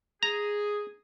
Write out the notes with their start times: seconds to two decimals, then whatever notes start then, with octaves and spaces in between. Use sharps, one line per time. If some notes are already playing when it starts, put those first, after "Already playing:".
0.23 G#4 A#5